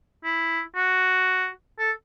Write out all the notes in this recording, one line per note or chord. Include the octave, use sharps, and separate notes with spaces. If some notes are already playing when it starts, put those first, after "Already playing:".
E4
F#4
A4